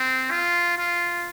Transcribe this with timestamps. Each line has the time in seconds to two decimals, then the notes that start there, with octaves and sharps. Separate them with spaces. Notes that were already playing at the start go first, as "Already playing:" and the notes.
Already playing: C4
0.31 F4
0.78 F4